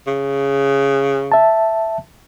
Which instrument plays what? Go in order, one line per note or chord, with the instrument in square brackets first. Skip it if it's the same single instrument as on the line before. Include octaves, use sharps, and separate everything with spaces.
[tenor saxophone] C#3
[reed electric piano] E5 A5